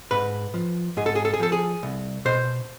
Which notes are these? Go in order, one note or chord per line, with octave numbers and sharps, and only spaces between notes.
G#2 B4
F3
G#2 G#4
A4
G#4
A4
G#4
F3 A4
G#4
C2
B2 C5